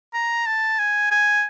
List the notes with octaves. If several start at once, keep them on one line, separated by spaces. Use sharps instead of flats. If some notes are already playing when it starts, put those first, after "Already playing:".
A#5
A5
G#5
G#5